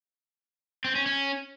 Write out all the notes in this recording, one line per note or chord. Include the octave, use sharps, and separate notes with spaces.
C4
C#4
C#4